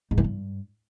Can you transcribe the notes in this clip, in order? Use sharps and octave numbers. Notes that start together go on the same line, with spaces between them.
G#2
E3
G2